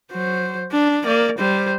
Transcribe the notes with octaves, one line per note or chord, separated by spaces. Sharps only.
F#3 C5
D4
A#3 D5
G3 C5